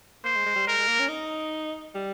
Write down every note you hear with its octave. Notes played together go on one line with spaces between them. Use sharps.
A#3 C5
G#3
G#3
G3
G#3 A#4
G#3
A#3
C#4
D#4
G3